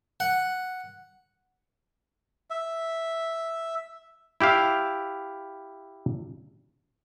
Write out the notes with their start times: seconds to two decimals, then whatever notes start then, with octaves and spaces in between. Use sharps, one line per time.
0.20 F#5
2.50 E5
4.41 E4 G4 E5 F5